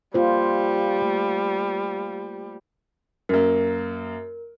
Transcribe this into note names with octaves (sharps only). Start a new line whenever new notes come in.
G3 A#3 F4 C5
A3
F#2 A#3 A#4